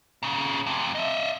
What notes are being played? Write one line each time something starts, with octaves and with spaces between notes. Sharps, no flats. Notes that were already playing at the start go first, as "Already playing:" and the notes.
A#2 C#3
F2 C3
D#5 E5